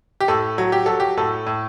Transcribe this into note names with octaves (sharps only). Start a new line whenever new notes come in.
G4
A2 A4
F#3
G4
F#3 A4
G4
A2 A4
A2